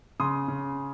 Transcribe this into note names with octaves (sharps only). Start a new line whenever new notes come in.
C#3 C6 D#6
C#3